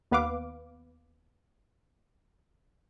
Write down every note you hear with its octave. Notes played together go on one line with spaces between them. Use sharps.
D#2 B3 B4 F5 D6